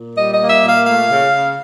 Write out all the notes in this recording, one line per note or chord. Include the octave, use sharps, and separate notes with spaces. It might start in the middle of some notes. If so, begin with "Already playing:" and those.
Already playing: A#2
G3 D#5
D#5
A#3
E5
A#2
F5
A3 F5
C#3
C#3